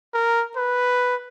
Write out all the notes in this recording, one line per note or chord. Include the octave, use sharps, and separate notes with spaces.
A#4
B4